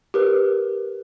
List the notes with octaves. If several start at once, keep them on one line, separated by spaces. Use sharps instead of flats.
G4 A#4 B4